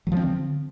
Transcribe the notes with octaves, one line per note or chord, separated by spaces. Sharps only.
D3 F3 F#3 C4